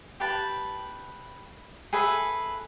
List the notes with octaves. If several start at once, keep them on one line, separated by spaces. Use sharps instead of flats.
G4 B4 A5
G#4 A4 B4 E5